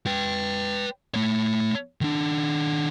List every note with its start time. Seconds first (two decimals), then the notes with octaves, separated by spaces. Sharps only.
0.06 B4 G5
1.14 A3 C#5
2.01 D#3 D4